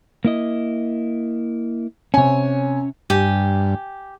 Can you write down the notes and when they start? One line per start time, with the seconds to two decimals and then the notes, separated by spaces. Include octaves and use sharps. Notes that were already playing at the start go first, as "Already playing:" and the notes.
0.25 A#3 E4 D#5
2.14 C3 C#4 C#5 G#5
3.10 G2 G4 G#5